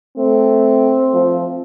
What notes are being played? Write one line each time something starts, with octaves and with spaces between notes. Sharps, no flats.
A3 C4
F3